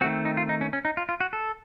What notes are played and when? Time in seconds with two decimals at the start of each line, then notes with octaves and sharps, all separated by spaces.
0.01 D#3 A3 C4 F#4
0.25 D#4
0.37 F4
0.49 D#4
0.61 C#4
0.73 C#4
0.85 D#4
0.97 F4
1.09 F4
1.20 F#4
1.33 A4